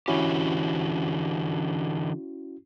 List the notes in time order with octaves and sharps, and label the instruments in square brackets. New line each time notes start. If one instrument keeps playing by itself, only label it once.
[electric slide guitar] D3 E3 G4 [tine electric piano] C#4 E4 F#4